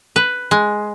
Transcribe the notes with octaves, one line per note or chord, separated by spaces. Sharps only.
B4
G#3